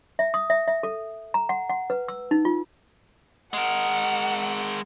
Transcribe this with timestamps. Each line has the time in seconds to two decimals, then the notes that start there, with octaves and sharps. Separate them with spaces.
0.19 E5
0.34 D#6
0.50 E5
0.68 E5
0.83 A4
1.34 A#5
1.49 F#5
1.69 F#5
1.90 B4
2.08 E6
2.31 D#4
2.45 F4
3.54 G#3 A#4 F#5